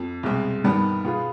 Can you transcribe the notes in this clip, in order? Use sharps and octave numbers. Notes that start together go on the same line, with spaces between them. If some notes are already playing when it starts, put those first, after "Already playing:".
Already playing: F2
C2 B2 G#3 C4
G2 D#3 G3 B3
B2 B3 F4 G#4